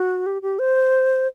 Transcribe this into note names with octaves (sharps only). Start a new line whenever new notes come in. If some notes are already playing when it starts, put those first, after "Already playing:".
Already playing: F#4
G4
G4
C5